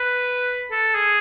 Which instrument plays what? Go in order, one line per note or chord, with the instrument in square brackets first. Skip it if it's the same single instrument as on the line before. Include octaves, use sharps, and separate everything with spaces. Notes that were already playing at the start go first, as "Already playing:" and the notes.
Already playing: [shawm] B4
A4
G#4